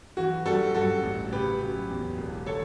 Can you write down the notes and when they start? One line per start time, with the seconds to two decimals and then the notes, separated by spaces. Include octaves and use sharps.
0.17 E3 F#4
0.46 G3 F#4 A4
0.75 G2 F#4 A4
1.03 A1
1.32 C#3 G4 B4
1.61 F#3
1.90 E2
2.18 E1
2.46 D3 A4 C#5